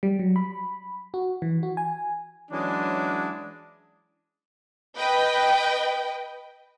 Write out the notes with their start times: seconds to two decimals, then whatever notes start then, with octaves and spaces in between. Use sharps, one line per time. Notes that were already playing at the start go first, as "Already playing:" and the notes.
0.03 G3
0.19 F#3
0.36 B5
1.14 F#4
1.42 E3
1.63 F#4
1.77 G#5
2.51 E3 F#3 G#3 C#4 D4
4.96 B4 D#5 G5